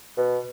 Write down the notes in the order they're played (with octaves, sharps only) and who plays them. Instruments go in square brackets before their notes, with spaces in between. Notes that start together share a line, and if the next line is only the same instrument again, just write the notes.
[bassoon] B2